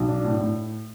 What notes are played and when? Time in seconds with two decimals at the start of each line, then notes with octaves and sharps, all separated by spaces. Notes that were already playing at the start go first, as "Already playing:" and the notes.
Already playing: B1
0.08 D4
0.25 A2
0.40 A2